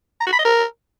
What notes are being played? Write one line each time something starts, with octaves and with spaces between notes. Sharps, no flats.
A#5
F#4
B5
D#5
A#4